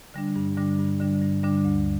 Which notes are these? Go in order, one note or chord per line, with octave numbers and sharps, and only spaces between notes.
D3 G3 D4
G2
D3 G3 D4
G2
D3 G3 D4
G2
D3 G3 D4
D2